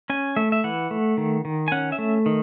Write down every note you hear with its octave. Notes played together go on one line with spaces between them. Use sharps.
C#4 G#5
A3 E5
E5
E3 F#5
A3
D#3
D#3
G#5
C#4 F#5
E5
A3
D#3